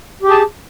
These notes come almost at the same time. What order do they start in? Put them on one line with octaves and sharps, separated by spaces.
G4 G#4 A5